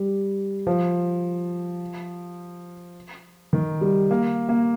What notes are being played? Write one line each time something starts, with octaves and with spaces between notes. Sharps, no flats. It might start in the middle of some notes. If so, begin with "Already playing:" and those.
Already playing: G3
F3
D#3
G3
A#3
A#3